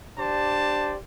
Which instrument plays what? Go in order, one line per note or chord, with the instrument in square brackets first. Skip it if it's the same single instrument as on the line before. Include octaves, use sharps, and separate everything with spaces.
[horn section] D4 G4 C5 D5 A5